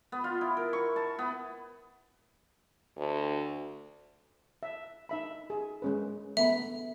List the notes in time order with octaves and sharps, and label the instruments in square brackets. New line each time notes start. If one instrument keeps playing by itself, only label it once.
[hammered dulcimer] B3
F4
E4
A#4
C#6
A5
B3
[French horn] D2
[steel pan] E5
D#4 E5 B5
G#4
G#3 C#4 B4
[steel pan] A3 B3 B5 [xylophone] E5